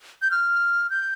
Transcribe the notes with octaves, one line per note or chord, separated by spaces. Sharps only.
G6
F6
G6